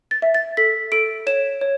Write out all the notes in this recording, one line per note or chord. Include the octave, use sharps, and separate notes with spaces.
A6
E5
A6
A4 B6
A4 D7
C#5 E7
C#5